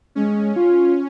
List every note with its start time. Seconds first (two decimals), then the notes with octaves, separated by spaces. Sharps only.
0.15 G#3 C#4
0.56 F4